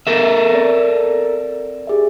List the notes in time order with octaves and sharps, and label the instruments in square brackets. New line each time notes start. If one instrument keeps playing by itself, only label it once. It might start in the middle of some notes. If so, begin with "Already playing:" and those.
[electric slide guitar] A4 A#4 E5
[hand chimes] C4 D5
G4 G#4 E5